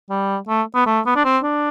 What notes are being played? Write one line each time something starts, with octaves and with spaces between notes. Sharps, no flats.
G3
A3
B3
A3
B3
D4
C4
D4